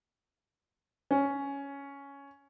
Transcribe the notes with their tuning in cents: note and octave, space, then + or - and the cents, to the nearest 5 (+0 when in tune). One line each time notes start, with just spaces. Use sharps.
C#4 +5